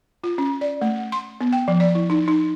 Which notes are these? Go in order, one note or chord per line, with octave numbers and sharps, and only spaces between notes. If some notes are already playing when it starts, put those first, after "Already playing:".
F4
C#4
D5
A3
C6
B3
G5
F3
D5
E4
D#4
D#4